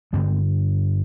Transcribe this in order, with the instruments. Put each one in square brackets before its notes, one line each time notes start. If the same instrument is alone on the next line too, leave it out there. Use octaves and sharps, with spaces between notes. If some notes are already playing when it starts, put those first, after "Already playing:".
[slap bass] G2 D3 G#3 C4